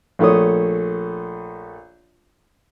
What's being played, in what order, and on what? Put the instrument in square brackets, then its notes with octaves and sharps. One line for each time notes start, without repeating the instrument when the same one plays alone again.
[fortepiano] A#1 A3 C#5 D#6